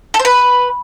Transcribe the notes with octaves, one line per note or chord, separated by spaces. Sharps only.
A4
C5
B4